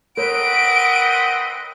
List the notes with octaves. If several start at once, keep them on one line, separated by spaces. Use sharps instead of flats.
C4 A#4 B4 C#5 D#5 F#5 D7